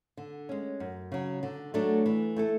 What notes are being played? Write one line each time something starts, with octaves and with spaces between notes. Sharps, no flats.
D3
G#3 C#4
F#2
C#3 F#3
D3
F#3 A3 D4 A4
E3
A3 E4 A4